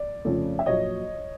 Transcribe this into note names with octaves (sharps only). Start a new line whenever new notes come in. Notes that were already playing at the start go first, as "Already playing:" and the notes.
Already playing: D5
F2 C#3 F3 A3 C#4
E5
A#1 A#2 F#3 C#5 D#5